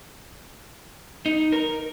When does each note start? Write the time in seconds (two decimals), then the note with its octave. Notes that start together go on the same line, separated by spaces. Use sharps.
1.26 D#4
1.52 A#4